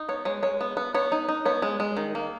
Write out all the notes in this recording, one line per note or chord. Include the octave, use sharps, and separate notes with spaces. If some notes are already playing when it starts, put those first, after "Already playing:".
Already playing: D#4
B3 C#5
G#3 C#5
G#3 C#5
B3
B3
B3 C#5
D#4
D#4
B3 C#5
G#3
G#3
D#3
A#3